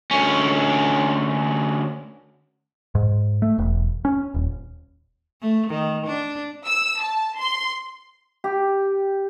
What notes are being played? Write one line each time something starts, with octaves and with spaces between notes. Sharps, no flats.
D2 C#4
G#2
A3
E1
C#4
D#1
A3
D#3
D4
E6
A5
C6
G4